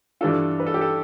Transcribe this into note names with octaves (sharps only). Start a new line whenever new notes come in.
G2 E3 G3 D4 F4 A4
B4
A4
G4
A4